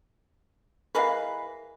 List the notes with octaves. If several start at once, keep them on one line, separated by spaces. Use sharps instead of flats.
E3 G#3 A#4 B4 F5